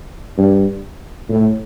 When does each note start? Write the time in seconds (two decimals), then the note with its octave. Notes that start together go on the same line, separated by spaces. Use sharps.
0.38 G2
1.29 A2